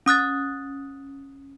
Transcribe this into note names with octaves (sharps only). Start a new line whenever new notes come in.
C#4 D#6 F#6 A6